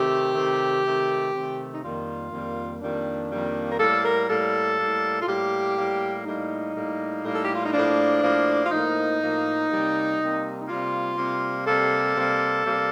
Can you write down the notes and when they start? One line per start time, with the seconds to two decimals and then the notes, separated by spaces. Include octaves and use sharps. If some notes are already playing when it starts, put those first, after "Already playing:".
Already playing: C3 D#3 A3 G4
0.35 C3 D#3 A3
0.84 C3 D#3 A3
1.33 C3 D#3 A3
1.73 D#4
1.83 F2 D#3 G3 A#3 F4
2.32 F2 D#3 G3 A#3
2.81 F2 D#3 G3 A#3 D4
3.31 F2 D#3 G3 A#3
3.71 A#4
3.80 A2 G3 A#3 A4
4.04 A#4
4.29 A2 G3 A#3 A4
4.79 A2 G3 A#3
5.22 F4
5.27 A2 G3 A#3 G4
5.77 A2 G3 A#3
6.26 A2 G3 A#3 D#4
6.75 A2 G3 A#3
7.24 A2 G3 A#3
7.34 A4
7.43 G4
7.53 F4
7.64 D#4
7.73 A2 F3 A#3 D4
8.22 A2 F3 A#3
8.64 F4
8.71 A2 F3 A#3 D#4
9.21 A2 F3 A#3
9.70 C3 G3 A#3
10.20 C3 G3 A#3
10.61 D#4
10.68 C3 G3 A#3 F4
11.17 C3 G3 A#3
11.67 C3 G3 A#3 A4
12.16 C3 G3 A#3
12.65 C3 G3 A#3